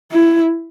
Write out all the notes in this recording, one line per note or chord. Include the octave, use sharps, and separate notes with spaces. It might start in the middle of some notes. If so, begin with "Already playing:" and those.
E4